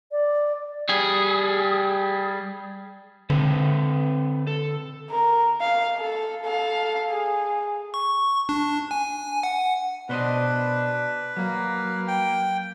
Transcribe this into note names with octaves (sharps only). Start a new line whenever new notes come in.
D5
G3 G#4
D3 C4 A4 B4
A4
A#4
F5
A4
A4 F5
G#4
C#6
D4
G#5
F#5
B2 D4 B4 C5 D#5
F#3 A#3
G5